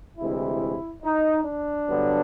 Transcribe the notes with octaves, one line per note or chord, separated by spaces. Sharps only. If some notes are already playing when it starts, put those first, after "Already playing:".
D2 C3 E3 G#3 E4
D#4
D4
G2 D3 F#3 B3